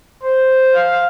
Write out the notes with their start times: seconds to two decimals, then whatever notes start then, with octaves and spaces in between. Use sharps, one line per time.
0.22 C5
0.74 F5